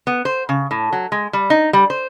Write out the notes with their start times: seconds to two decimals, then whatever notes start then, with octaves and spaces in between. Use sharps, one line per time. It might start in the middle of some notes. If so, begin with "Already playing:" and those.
0.07 B3
0.25 C5
0.49 C#3
0.71 A2
0.93 F#3
1.12 G#3
1.33 G3
1.50 D#4
1.73 G3
1.90 C5